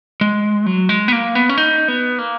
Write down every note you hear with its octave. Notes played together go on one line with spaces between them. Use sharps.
G#3
F#3
G#3
B3
A#3
B3
C#4
D#4
B3
A#3